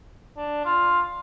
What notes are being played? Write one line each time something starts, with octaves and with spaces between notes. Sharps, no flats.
D4
F4